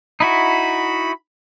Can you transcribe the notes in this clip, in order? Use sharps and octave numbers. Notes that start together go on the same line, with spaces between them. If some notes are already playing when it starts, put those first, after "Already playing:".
D#4 E4 F#4 B5